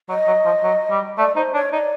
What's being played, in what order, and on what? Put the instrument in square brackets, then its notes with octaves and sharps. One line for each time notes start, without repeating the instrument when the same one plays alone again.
[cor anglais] F#3 [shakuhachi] D#5
[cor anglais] F#3
F3
F#3
G3
[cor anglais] A3 [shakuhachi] D5
[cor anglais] D#4 [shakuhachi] C5
[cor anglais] D4 [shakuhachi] C#5
[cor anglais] D#4 [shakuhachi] D5